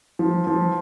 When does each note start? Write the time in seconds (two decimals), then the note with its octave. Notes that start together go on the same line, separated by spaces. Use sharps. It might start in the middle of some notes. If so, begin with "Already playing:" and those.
0.19 F3
0.47 F3